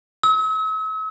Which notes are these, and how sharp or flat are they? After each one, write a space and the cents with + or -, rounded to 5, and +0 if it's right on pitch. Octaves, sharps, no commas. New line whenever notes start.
E6 -45